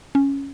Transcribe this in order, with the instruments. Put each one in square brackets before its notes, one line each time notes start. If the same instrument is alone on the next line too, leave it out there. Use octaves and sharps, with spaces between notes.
[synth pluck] C#4